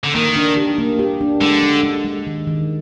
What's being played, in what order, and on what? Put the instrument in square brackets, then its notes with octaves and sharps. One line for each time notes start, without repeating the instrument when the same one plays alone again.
[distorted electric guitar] D3
[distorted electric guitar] D#3 [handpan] A#3
[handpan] D4
G4
A#3
G4
D4
[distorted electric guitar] D3 [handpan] G#3
[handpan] G#3
G#3
G#3
D#3
D#3